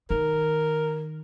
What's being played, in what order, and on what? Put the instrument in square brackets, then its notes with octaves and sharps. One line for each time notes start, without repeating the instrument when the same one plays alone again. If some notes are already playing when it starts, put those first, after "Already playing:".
[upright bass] D#3 [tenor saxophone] A#4